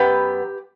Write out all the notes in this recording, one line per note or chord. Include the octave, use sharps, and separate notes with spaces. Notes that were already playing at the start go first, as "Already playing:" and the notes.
Already playing: F#2 B3 G4 B4